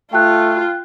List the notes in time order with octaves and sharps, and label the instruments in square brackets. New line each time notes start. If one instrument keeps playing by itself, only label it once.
[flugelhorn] A3 [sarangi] F4 [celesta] G5 F#6